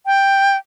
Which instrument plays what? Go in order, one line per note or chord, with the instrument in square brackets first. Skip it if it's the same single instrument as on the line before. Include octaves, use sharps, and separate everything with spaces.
[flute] G5